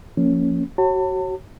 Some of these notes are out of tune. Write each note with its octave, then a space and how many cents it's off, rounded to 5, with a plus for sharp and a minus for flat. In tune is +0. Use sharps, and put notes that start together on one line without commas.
F3 -5 A#3 -10 C#4 +0
F#4 +30 C#5 -25 A5 +40